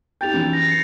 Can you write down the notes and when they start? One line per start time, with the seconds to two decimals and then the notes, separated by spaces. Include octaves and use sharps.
0.21 D#4 G4 G5 G6 A6 F7
0.33 F#2 E3
0.53 A#6
0.68 C7 C#7